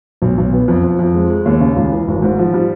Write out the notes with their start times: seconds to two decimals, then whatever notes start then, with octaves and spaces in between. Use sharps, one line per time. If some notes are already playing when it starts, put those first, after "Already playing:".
0.22 B1
0.38 B1
0.53 B3
0.68 F2
0.84 F2
0.99 F2
1.14 G#3
1.30 G#3
1.46 D#2
1.60 C#3
1.76 C#2
1.92 E3
2.08 G#1
2.22 G#2
2.38 F3
2.54 G3